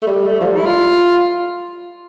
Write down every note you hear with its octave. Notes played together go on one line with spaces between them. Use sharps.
A3
G3
A3
F3
G3
E4
F4